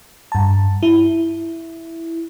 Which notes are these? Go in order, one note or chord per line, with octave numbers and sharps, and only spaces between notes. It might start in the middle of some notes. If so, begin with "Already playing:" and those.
G2 A5
E4